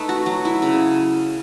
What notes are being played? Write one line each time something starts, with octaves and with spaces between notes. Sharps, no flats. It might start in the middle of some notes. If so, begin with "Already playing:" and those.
Already playing: A3 D#4 B4
F#4
F#3
E4
C#3